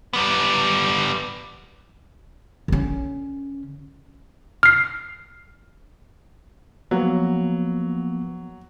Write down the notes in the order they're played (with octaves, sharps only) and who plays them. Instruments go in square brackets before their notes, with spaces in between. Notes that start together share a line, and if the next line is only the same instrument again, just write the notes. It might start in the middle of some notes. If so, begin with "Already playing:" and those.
[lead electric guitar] G3 B3
[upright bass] D3 C#4
[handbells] F6 C7
[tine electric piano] F3 A#3 B3 [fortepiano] F#3